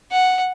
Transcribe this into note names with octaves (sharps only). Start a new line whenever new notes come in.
F#5